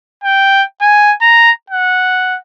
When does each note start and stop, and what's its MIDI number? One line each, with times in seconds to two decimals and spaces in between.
0.24 0.64 79
0.81 1.14 80
1.22 1.51 82
1.70 2.37 78